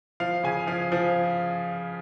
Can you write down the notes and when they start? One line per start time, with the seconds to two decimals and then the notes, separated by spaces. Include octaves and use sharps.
0.20 F3 F5
0.43 C#3 G#5
0.67 F3 F5
0.92 F3